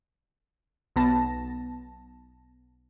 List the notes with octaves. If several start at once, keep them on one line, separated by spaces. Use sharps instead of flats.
B1 B3 A5 A#6